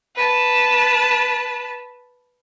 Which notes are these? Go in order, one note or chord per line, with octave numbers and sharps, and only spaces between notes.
B4 A5